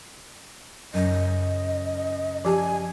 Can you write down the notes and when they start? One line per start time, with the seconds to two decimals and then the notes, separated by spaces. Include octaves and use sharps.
0.94 F#2 C#3 D#5
2.45 F3 G4 G#5 A5